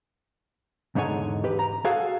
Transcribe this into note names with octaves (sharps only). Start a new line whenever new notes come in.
E2 G#2 D3 D#4 C#5 G#5
G4 B4
A#5
F#4 G#4 A4 F5 G#5